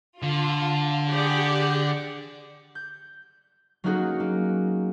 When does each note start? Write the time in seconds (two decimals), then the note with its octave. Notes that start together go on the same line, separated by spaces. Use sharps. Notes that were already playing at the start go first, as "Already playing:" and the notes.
0.22 D3 F4
1.09 G4 G#4 D5 F#5
2.75 G6
3.84 F#3 A#3 C#4 D#4 F#4 G#4
4.20 A#3